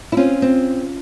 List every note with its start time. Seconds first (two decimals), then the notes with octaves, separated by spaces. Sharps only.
0.12 E4
0.17 C4 C#4 F4
0.42 C4